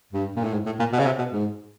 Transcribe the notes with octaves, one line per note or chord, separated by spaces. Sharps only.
G2
A#2
A2
G#2
A2
A#2
B2
C#3
C3
B2
G#2